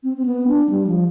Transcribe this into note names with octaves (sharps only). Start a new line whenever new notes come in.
C4
C4
B3
D4
G3
F3